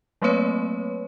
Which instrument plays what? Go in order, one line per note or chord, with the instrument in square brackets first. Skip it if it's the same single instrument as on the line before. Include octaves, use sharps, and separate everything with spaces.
[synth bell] F#3 A3 A#3 C4 B4 C#5